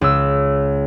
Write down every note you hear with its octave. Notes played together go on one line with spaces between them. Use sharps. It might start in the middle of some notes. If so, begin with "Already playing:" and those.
C#2 E6